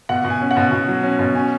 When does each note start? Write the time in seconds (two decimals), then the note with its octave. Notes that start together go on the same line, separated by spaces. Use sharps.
0.09 B2 F#5
0.24 B2
0.30 G#5
0.41 C#4
0.51 F#5
0.57 B2
0.72 B2
0.88 F#3
1.03 C#4
1.19 B2
1.35 C#4 G#5